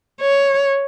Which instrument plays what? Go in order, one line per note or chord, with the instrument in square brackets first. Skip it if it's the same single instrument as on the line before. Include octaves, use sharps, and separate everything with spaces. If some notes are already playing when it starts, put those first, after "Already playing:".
[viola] C#5